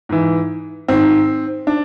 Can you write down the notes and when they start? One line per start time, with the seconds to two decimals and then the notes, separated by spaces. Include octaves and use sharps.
0.09 G#2 E3
0.88 G#2 D#3 C4
1.67 D4